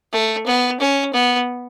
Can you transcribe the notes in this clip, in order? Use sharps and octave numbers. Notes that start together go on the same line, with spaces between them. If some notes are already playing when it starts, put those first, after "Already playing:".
A3
B3
C#4
B3